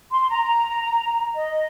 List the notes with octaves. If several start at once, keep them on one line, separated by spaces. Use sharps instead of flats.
C6
A#5
D#5